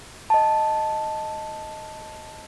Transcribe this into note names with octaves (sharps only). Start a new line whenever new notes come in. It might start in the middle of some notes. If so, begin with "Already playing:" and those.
D#5 A5